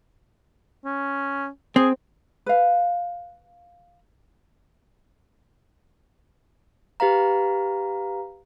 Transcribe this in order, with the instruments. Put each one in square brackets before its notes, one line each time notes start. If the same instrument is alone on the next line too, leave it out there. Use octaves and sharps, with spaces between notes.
[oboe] C#4
[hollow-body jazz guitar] C4 [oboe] G#4
[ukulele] B4 F5
[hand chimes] G4 B4 F5 A#5